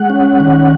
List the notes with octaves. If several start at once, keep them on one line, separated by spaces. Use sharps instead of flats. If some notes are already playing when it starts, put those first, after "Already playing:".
Already playing: G#3 F#5
C#4
D#3